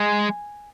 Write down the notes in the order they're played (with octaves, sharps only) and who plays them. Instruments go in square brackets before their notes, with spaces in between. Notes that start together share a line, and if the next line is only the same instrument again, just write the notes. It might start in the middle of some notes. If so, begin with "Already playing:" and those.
Already playing: [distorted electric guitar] G#3 [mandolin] G#5